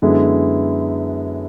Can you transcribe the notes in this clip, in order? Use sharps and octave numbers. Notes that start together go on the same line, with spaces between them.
F#2 D3 G#3 B3 E4